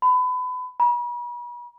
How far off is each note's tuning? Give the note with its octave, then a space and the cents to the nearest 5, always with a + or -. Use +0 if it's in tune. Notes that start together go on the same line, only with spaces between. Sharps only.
B5 +30
B5 -40